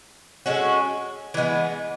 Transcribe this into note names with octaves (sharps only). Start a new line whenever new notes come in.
G#3 C#4 F#4 A4
E3 G#3 B3